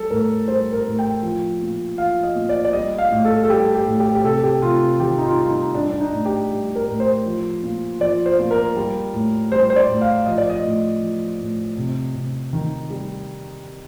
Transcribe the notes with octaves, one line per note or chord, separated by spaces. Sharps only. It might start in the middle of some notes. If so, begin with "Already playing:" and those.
Already playing: G3 A4
A2 A#4
G3 C5
A#4
A2
G5
F3
A#2
F3 F5
D#5
A#2
D5
D5
G3 D#5
F5
A2
A4
A4
G3 G4
G4
A2
G4
G4
C3 A4
G4
C3 F4
D#3 G4
D#4
F4
G3 F4
D#4
G3 D4
D4
D#4
A2
G4
G3
A#4
A2
C5
F3
A#2
F3 D5
C5
A#2
A#4
G3
A2
G3 C5
C5
D5
A2
F5
F3 D#5
D5
D#5
A2
F3
A2
C3
C3
D#3
G3